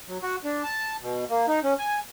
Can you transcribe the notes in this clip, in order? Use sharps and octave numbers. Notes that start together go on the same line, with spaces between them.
F#3
F#4
D4
A5
B2
A#3
D#4
C#4
G#5